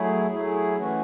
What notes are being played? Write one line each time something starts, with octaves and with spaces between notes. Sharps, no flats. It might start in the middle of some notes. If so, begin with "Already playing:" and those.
Already playing: F#3 A3 E4 G#4
F#3 A3 E4 G#4
E3 A3 C#4 F#4